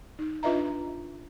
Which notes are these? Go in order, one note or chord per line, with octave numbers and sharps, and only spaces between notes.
D#4
D4 F4 B4 D#5 E5 A#5